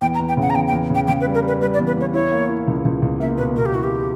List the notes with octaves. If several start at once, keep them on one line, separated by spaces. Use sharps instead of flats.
E2 G5
A#5
E2
G5
C#3 F#5
A#5
E2 G5
G5
E2
C#3
G5
C#3 G5
B4
G3
A#4
G3
B4
G3 B4
D5
E2
B4
E2 C#5
E4 C#5
A#3
E4
C#2
C#2
C#2
A#3 E5
B2 B4
B2 A#4
G4
E4 F#4
G4